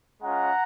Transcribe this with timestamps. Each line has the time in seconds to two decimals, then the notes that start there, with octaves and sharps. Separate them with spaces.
0.22 G#3 C#4 F4 F#5 A#5